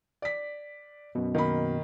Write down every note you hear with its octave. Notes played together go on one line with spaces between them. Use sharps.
D5 B6
F#2 B2
D#3 A#3 B5